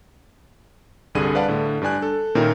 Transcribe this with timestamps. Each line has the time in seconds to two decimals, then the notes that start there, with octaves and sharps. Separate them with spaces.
1.15 C2 G2 D3 G#4 D#7
1.35 B4 D5 F5 F#5 A5
1.48 A2 D3
1.82 G2 D4 D5 G#5 F#6
2.02 A4
2.35 A#2 D#3 C#4 E4 A#4 G5